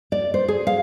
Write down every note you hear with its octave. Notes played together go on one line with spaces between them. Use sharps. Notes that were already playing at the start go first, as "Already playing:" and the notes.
D5
C5
G#4
F5